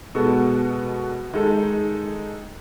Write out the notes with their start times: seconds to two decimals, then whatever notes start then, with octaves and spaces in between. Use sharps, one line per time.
0.15 B2 G#3 B3 F#4 A4
1.33 D#3 G#3 D#4 A4